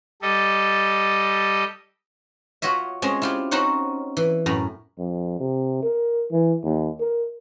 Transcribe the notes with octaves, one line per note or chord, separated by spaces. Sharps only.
G3 A4 D#5
F4 F#4 C#5 D#5 E5
G#3 C4 C#4 G#4
E4 F4 G4
C4 C#4 D#4 F#4 C5 F#5
E3
F#2 A2 A#5 B5
F2
C3
A#4
E3
D#2
A#4